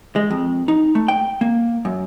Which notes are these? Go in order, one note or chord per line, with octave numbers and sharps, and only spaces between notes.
G#3
F2
D#4
A3
G5
A#3
F#2